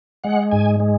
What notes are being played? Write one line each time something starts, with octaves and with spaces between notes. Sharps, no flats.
G#3 F#5
G#2 G#5
G#3